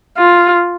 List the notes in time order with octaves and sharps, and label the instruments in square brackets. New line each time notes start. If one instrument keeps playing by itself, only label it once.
[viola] F4